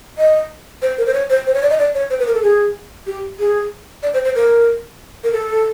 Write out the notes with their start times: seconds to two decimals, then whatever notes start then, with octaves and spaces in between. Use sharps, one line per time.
0.18 D#5
0.82 C5
0.98 A#4
1.06 C5
1.14 C#5
1.30 C5
1.47 C5
1.55 C#5
1.62 D5
1.70 D#5
1.79 D5
1.95 C#5
2.10 C5
2.19 B4
2.27 A#4
2.34 A4
2.43 G#4
3.07 G4
3.39 G#4
4.03 D5
4.14 C5
4.25 C5
4.35 A#4
5.24 A#4
5.32 A4